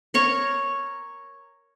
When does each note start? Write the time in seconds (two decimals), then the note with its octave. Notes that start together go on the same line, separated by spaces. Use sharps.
0.14 A#4 C#5 C#6